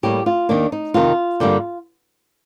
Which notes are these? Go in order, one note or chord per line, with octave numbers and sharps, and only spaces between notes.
A2 G3 A#3 G4
F4
D#2 D#3 A#3 D4
D#4
F2 C3 D#3 F4
G2 D3 G3 A#3